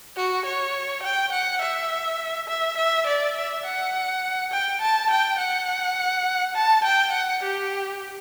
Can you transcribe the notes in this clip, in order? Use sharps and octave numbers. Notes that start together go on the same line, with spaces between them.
F#4
C#5
G5
F#5
E5
E5
E5
D5
E5
F#5
G5
A5
G5
F#5
A5
G5
F#5
G4